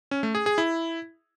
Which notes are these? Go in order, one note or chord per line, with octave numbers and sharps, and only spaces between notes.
C#4
A3
G#4
G#4
E4